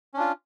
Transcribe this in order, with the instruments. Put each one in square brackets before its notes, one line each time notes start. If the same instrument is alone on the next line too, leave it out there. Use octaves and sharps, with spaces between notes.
[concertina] C#4
D4
F4